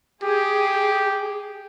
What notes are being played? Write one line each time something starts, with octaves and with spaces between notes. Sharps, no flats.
G4 G#4